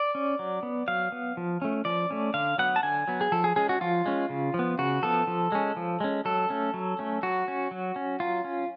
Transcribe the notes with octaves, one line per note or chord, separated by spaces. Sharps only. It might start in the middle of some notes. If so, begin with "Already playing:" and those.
Already playing: D5
C#4
F#3
B3
F#3 F5
B3
F3
A3 C#4
F3 D5
A3 C#4
D3 F5
F#3 B3 F#5
A5
D3 G#5
F#3 B3
G#4
F3 A4
G#4
G#3 C#4 G#4
F#4
F3 F4
G#3 C#4
C#3
F3
B3
C#3 F#4
F3 B3 A4
F3
G#3 C#4
F3
G#3 C#4
F#3 A4
A3 C#4
F#3
A3 C#4
F#3 F#4
C#4
F#3
C#4
F#3 F4
C#4